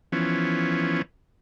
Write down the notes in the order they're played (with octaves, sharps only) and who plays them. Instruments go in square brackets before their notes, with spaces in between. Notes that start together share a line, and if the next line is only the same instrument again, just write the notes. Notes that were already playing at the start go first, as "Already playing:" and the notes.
[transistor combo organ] E3 F3 B3 C#4